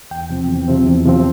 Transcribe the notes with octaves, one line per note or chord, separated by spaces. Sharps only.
E2 G5
C3 F3 C4
E2
C3 F3 C4
E2
C3 F3 C4